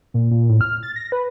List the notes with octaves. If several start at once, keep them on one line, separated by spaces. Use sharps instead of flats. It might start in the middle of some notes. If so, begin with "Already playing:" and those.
A#2
A#2
A2
F6
A6
A#6
B4